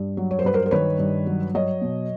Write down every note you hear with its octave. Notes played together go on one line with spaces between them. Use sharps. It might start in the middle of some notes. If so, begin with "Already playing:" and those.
Already playing: G2
F#3
C#5
C5
G2 B4
A#4 C5
C5
D#3 B4 C#5
G2
F#3
F#3 C#5 D#5
B2